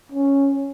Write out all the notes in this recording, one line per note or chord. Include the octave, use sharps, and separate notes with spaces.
C#4